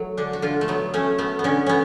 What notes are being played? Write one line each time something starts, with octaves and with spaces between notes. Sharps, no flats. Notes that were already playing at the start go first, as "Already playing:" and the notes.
Already playing: F#3 A3
D3 D4
F#4
D3 F4
A3
F#3 B3
A3 C#4
A3 B3
B3
D3 C#4
B3 C#4